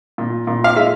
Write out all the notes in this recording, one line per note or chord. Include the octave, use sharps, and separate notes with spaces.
A#2
A#2
F5
G#3 E5